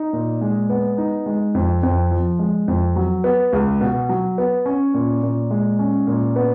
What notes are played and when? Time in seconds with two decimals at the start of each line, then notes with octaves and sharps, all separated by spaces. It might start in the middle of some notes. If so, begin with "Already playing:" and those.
Already playing: D#4
0.13 A#2
0.41 G#3
0.70 B3
0.98 D#4
1.26 G#3
1.55 F2
1.83 F2
2.11 F3
2.39 G#3
2.68 F2
2.96 F#3
3.24 B3
3.53 C#2
3.81 B2
4.09 F#3
4.38 B3
4.66 C#4
4.94 A#2
5.23 A#2
5.51 G#3
5.79 C#4
6.07 A#2
6.36 B3